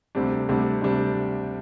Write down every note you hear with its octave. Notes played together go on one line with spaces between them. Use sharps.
D2 C3 G3 D4
D2 C3 G3 D4
D2 C3 G3 D4